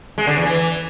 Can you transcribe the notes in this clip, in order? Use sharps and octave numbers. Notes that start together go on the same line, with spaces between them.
G#3
D3
E2
E3